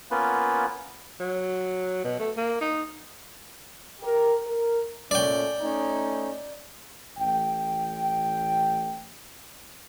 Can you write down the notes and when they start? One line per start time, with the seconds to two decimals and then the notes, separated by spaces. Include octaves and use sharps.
0.11 A#3 B3 C#4 F4 B4
1.20 F#3
2.04 B2
2.19 A3
2.37 A#3
2.61 D#4
4.02 G4 A#4
4.46 A#4
5.11 A#2 A3 C#4 D5 G5
5.61 A3 C#4 D#4
7.19 A1 G5